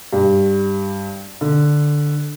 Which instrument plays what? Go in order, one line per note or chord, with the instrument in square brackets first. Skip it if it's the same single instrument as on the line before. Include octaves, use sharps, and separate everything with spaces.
[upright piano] G2
D3